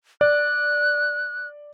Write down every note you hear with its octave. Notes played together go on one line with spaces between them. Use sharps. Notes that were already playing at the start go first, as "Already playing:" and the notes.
D5 F#6